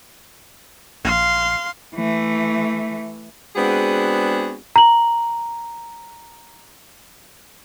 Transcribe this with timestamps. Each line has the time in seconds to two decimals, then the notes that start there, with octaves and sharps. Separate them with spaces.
1.04 A#1 F5 C6
1.95 E3 A3
3.56 G#3 B3 C4 D4 F#4 G#4
4.76 A#5 F#7